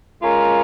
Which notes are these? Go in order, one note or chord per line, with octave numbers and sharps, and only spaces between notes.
G#3 C#4 F4 A#4